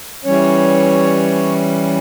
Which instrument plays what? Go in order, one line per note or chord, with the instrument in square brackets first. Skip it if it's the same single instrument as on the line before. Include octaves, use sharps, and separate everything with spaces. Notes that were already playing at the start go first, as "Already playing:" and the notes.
[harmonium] E3 G3 C#4 C#5